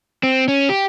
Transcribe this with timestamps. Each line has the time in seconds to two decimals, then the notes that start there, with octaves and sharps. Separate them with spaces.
0.23 C4
0.48 C#4
0.69 G4